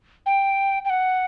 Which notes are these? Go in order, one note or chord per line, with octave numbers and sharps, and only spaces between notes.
G5
G5
F#5